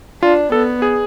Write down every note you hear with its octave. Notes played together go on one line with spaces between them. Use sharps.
D4 F4
B3 A4
G#4